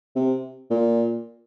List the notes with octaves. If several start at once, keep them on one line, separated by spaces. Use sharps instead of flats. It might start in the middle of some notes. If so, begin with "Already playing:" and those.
C3
A#2